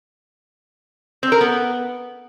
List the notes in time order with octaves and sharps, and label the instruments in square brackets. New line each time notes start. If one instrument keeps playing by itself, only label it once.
[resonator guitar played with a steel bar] C4
A#4
B3